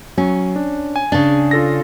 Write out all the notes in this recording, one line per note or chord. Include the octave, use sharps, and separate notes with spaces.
F#3 C#4
D4
G#5
C#3 D4
F4 A4 A#6